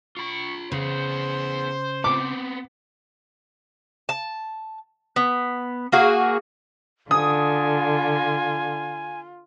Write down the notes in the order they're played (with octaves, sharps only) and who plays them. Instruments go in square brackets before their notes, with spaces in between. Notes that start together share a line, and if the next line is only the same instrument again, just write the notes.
[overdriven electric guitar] F4 B5 [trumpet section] C#6
[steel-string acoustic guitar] C#3 [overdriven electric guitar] B3 G#4 [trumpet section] C5
[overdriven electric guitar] B3 C4 [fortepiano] D6
[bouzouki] A5
B3
A#3 F#4 G#4
[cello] D3 [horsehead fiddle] F4 [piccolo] G#5 [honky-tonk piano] D#6